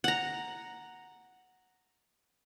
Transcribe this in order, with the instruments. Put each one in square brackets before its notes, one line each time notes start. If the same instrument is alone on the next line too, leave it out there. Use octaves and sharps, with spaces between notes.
[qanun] F#5 A#5